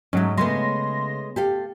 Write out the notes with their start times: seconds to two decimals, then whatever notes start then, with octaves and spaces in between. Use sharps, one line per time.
0.13 G#2 F#3 A3 C#4
0.37 C#3 G#3 A3 B3 C6 A#6
1.36 G4 A4 F5